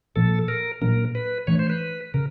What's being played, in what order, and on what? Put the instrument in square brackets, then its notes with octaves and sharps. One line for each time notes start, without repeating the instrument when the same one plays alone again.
[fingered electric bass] A#2 F3 A#3 [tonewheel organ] A4
[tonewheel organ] A#4
[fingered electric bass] A#2 F#3 A#3 D4 [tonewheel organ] A#4
[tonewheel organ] B4
[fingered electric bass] E3 A3 D4 [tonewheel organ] C#5
[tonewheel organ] C5
B4
[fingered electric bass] C#3 [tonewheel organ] A#4